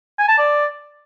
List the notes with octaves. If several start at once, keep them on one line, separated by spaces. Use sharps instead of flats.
G#5
A5
D5